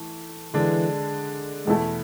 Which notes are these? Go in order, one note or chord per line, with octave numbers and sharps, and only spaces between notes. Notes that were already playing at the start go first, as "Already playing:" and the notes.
Already playing: E3 A3
D3 E3 G#3 D4
E2 B2 G#3 A3 E4 A4